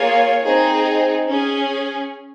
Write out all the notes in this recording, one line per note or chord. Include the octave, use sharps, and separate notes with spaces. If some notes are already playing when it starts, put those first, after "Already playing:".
Already playing: A#3 F4 G#4 C#5
C4 D#4 G#4
C#4 G#4